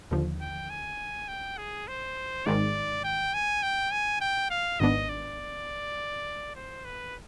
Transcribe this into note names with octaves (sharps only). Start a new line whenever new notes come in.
D#2 D3 F3
G5
G#5
G5
G#4
C5
G#1 G#2 D#3 G#3 D5
G5
G#5
G5
G#5
G5
F5
G#1 G#2 D#3 B3 D4 D#5
D5
C5
B4